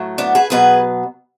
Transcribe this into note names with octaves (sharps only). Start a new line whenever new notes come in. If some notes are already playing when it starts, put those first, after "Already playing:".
Already playing: A2 F#3 A3
B3 D4
G#4 B4
B2 F#3 B3 G#4 B4